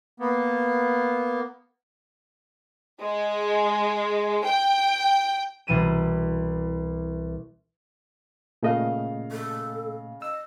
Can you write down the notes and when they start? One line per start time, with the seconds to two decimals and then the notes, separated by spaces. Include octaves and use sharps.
0.20 A#3 B3
3.02 G#3
4.45 G5
5.67 C2 B2 E3 D#7 E7
8.63 A#2 C#3 A3 D#5 F5
9.32 A4
10.22 D#5 E6